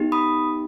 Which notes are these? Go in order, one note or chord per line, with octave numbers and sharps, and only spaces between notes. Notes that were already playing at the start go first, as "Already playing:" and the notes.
Already playing: B3 D#4 G4
B5 D#6